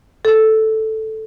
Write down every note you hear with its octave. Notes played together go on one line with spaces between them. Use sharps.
A4